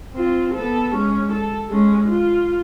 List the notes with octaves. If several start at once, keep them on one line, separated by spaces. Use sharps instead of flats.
C4 F4
B3 A4
G#3 C#4
A4
G#3 C#4
F4